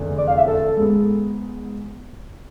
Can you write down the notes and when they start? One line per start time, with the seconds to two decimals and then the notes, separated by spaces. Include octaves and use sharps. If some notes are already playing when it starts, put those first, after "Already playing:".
Already playing: F1 E2 D3
0.18 D5
0.28 F5
0.38 E5
0.47 A4
0.77 G#2 G#3 B3